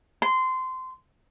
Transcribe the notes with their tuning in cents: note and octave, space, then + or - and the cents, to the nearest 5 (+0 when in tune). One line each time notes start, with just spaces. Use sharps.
C6 -20